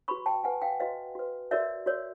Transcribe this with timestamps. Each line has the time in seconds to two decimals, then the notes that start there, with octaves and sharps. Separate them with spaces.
0.08 F#4 B4 B5 C#6
0.26 G5 A5
0.44 F#4 B4 F#5 G#5
0.62 F5 G5
0.80 F#4 B4 D#5 F5
1.15 F#4 B4
1.51 F#4 A#4 C#5 D5 E5
1.86 F#4 A#4 C#5 D5